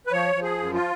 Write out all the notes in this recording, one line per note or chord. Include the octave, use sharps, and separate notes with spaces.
B4
F3 C#5
F3
G#4
F#2
F4